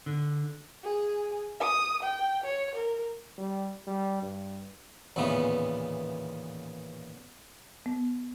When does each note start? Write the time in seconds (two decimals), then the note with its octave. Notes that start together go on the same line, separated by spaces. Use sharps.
0.06 D3
0.83 G#4
1.60 D#6
2.02 G5
2.44 C#5
2.75 A#4
3.38 G3
3.87 G3
4.22 G2
5.16 A1 D#2 A#2 C#3 E3 B3
7.86 B3